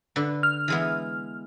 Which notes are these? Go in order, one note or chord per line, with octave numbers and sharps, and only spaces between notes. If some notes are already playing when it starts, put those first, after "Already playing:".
D3 B4
F6
E3 G#3 B3